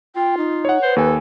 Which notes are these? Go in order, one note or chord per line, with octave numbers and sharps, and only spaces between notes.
F4 G5
D#4
C#5 F#5
B4 C5
D#2 A4 G#5